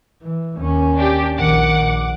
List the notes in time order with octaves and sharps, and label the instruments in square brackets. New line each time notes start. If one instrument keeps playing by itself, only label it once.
[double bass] E3
D#2 C#4
[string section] D4 G4
[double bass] A#1 D#3 [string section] F#5 D6
[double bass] A#1